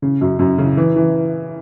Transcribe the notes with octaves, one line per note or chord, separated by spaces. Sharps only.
C#3
F#2
F#2
C#3
E3
E3